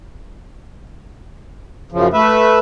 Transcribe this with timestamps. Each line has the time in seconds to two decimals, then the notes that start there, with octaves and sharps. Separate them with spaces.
1.92 F#2 C#3 F3
2.13 A3 B4 E5